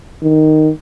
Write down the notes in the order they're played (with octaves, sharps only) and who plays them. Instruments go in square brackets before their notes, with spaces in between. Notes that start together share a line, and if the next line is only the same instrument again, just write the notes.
[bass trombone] D#3